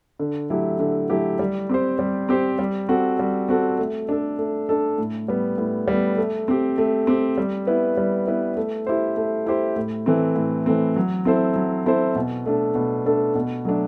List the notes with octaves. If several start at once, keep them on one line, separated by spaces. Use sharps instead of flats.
D3
F#3 A3 E4 G4
D3
F#3 A3 E4 G4
G3
C4 G4 C5
G3
C4 G4 C5
G3
C4 F#4 A4
G3
C4 F#4 A4
A3
D4 A4
A3
D4 A4
A2
G3 B3
A2
G3 B3
A3
C4 G4
A3
C4 G4
G3
B3 E4 B4
G3
B3 E4 B4
A3
E4 G4 C5
A3
E4 G4 C5
A2
E3 A3 C4
A2
E3 A3 C4
F#3
C4 E4 A4 C5
F#3
C4 E4 A4 C5
B2
A3 D4 A4
B2
A3 D4 A4
B2
F#3 A3 D4